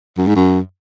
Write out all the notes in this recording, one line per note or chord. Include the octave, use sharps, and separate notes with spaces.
F#2
G#2
F#2